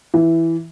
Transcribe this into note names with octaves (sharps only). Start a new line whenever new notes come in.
E3